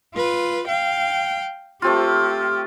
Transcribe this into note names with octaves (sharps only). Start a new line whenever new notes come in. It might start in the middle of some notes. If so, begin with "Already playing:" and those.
F4 B4
F5 G5
A3 C4 F4 G4